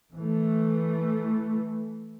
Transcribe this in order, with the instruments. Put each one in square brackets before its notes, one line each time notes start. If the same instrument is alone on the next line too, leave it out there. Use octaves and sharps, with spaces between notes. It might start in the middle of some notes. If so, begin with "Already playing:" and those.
[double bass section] E3 A3